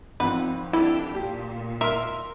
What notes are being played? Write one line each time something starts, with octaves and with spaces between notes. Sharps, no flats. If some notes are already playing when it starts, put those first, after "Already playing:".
G#1 F3 C4 B4 F#5
D4 E4 G4 A4
A#2 G4
A#4 E5 C6 F6